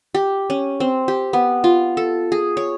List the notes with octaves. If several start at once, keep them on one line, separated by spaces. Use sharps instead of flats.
G4
C#4
C4
G4
B3
F4
A4
G#4
C#5